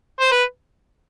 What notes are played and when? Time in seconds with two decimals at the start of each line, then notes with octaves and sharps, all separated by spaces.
0.20 C5
0.32 B4